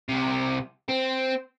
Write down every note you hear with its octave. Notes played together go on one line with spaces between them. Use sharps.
C2 C3
C4